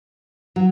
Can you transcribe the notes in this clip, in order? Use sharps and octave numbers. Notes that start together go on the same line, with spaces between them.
F#3